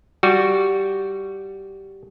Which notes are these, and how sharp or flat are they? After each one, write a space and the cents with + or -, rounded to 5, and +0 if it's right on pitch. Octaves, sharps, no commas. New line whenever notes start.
G3 -10 F#4 +0